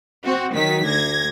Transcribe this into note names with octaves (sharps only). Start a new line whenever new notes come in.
C4 F#4
D#3 F#3 B6
D2 G#6 A#6